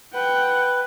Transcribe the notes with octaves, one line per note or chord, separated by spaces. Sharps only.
B4 F#5 G5